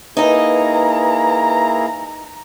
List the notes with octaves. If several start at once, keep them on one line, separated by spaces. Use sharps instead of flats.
A#3 D#4 E4 G#4 B4 D#5 A#5